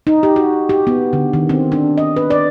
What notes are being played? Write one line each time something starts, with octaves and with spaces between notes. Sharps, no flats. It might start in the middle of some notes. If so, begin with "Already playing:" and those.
D#4
G4
F#4
G4
B3
D3
D#3
C4
D4
D#5
B4
D5